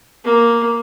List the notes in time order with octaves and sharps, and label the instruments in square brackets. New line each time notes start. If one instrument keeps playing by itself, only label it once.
[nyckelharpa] A#3